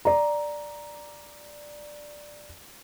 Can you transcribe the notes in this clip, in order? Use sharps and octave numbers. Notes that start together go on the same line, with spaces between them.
D5 A#5